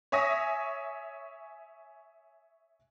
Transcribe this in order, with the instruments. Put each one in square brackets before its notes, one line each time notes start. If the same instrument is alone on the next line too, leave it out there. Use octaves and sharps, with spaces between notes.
[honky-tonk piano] C#5 E5 G#5 D#6 A#6